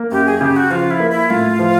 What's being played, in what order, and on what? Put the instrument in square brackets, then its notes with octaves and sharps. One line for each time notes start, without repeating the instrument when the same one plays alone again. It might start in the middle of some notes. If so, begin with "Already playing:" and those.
Already playing: [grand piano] A#3
[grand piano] F#2 [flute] G4
[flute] G#4
[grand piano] C#3 [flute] G4
[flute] F#4
[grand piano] F3 [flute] F4
[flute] E4
[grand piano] A#3
[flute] E4
[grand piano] A2 [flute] F4
[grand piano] F3